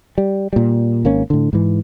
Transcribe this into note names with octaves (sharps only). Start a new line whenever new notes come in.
G3
A#2 G3
G#1 A#3 C#4
A2 D3
G#2 E3